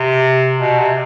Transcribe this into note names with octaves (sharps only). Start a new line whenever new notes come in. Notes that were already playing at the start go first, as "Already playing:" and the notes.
Already playing: C3
B2
C3